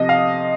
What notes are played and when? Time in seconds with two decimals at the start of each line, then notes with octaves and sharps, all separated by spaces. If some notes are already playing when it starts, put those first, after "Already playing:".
Already playing: C3 F3 D#5
0.09 F5